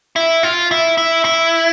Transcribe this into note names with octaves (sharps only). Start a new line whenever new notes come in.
E4
F4
E4
E4
E4